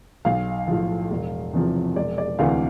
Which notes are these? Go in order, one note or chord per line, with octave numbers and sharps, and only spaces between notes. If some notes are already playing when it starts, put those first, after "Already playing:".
B1 F5
A2 F3
E1
E2 C3 F3
E1 D5
D5
D2 C3 E3 F5